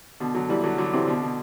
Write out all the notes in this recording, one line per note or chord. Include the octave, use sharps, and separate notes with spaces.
B2 D3
D3 F#3
E3 G3
D3 F#3
D3 F#3
C3 E3
B2 D3
B2